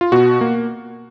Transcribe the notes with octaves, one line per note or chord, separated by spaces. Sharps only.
F4
B2 F#4
A#3